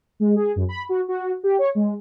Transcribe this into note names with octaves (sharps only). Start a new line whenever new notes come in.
G#3
G#4
F#2
B5
F#4
F#4
G4
C#5
G#3